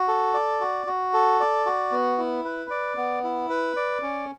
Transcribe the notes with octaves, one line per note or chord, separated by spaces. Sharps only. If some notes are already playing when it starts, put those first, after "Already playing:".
Already playing: F#4
A4
D5
F#4
F#4
A4
D5
F#4
B3
E4
B4
D5
B3
E4
B4
D5
C#4